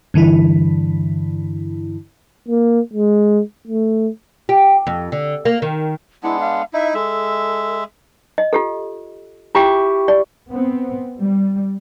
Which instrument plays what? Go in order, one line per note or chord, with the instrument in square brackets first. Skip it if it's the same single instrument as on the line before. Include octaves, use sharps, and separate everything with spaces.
[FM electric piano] G2 D3 E3 E4
[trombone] A#3
G#3
A3
[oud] G4
F2
D3
A#3
D#3
[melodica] G#3 B3 D4 [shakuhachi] E4
[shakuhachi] F5
[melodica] D#4 E4 [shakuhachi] E5
[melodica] G#3 E5 [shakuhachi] A4
[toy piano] D#5
F4 G4 A4
[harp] E4 G4 C#6 [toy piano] F4 G5
[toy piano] D5
[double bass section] B3 C4
G3